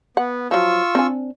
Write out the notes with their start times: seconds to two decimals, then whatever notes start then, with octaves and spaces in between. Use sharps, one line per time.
0.17 B3 F#5
0.51 F3 F#3 F4 C#6 E6
0.95 C4 D4 G#5